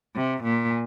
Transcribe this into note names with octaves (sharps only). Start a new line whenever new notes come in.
C3
A#2